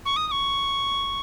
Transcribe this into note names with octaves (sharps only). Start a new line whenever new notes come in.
C#6
D#6
D#6
C#6